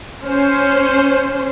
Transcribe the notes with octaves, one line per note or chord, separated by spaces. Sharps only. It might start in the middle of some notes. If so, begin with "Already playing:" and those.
C#4 C5